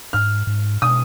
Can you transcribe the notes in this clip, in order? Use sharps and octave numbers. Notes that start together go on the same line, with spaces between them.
G#2 F6
G#2
B2 D#6